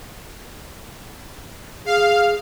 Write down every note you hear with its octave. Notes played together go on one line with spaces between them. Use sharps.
G#4 F5